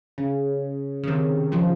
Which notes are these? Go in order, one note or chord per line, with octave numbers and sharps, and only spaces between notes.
C#3
C#3
C3 D#3
C#3 F3